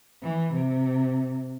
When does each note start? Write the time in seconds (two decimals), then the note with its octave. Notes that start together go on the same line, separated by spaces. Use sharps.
0.23 E3
0.54 C3